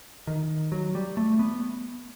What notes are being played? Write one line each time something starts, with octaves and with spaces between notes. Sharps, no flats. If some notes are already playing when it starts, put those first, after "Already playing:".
D#3
F#3
G3
A3
B3